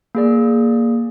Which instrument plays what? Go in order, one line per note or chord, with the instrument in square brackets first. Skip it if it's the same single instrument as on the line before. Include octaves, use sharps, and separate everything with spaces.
[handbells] A#3 G#4 D5